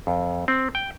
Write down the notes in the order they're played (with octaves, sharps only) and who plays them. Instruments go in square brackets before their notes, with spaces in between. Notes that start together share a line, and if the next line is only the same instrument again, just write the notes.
[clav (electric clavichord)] F2
C4
G5